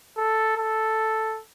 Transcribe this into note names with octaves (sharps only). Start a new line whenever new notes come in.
A4
A4